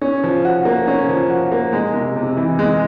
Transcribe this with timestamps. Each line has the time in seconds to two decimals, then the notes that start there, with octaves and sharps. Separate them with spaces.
0.01 C#4
0.24 F3
0.45 F#4
0.65 A#3
0.87 C#4
1.09 F3
1.30 F#4
1.52 A#3
1.73 G#3
1.94 C3
2.16 C3
2.37 E3
2.59 G#3